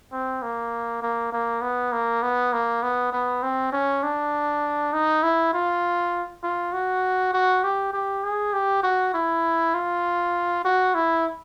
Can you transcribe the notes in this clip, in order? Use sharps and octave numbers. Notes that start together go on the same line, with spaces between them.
C4
A#3
A#3
A#3
B3
A#3
B3
A#3
B3
B3
C4
C#4
D4
D#4
E4
F4
F4
F#4
F#4
G4
G4
G#4
G4
F#4
E4
F4
F#4
E4